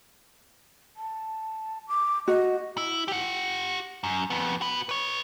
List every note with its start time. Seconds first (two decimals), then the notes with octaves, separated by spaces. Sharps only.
0.97 A5
1.88 D6
2.28 F#4 D#5
2.78 E4
3.08 G4 F#5
4.04 F#2
4.30 F2 B3
4.61 F#4 B4
4.89 B4 C#5